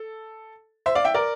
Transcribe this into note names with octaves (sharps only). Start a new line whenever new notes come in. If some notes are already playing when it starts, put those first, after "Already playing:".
Already playing: A4
C5 E5
D5 F5
E5 G5
A#4 D5